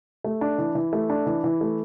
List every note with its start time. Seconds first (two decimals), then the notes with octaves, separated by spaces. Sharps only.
0.24 A3
0.41 D4
0.58 E3
0.75 E3
0.93 A3
1.10 D4
1.26 E3
1.44 E3
1.61 A3